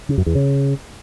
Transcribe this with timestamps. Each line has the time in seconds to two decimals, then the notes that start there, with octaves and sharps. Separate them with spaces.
0.09 C#3
0.18 F#2
0.26 E2
0.35 C#3